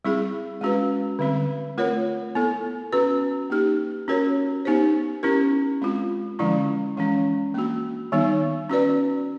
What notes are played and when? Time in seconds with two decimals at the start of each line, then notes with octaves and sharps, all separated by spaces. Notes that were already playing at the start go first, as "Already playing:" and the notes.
0.05 G3 C4 E4 G#4
0.61 G#3 C#4 F#4 B4
1.19 D3 G3 C4
1.78 A3 C4 F4 A#4 C#5
2.35 B3 E4 A4
2.93 C#4 F#4 B4
3.50 A#3 D#4 G4
4.08 C#4 F#4 A#4 C#5
4.65 B3 D#4 G4 C5
5.23 C#4 E4 G4 A#4
5.82 G#3 C4 F4
6.39 D3 F3 G#3 C#4 E4
6.97 E3 G#3 C#4
7.54 A#3 D4 F#4
8.12 D#3 G3 B3 D#4
8.69 C#4 F#4 B4 D5